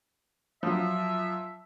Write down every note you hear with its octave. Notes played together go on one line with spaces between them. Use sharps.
F3 F#3 E5